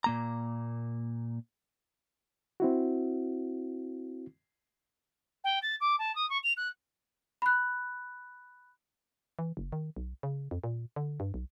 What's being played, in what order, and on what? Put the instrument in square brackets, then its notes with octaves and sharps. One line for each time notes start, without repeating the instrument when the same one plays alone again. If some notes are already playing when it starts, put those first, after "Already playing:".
[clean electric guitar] A#2 A#3 A#5
[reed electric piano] C4 E4 F#4
[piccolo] G5
A6
D6
A5
D#6
C#6
F7
F#6
[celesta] B5 F#6
[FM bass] E3
F#1
D#3
B1
C#3
F2
A#2
D3
G2
B1